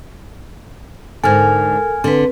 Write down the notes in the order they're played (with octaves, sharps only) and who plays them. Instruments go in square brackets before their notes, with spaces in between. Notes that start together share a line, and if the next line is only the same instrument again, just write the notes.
[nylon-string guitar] G#2 D3 [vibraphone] A4 A#4 [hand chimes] G#5 F6 G#6
[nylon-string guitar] D3 [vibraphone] C4 B4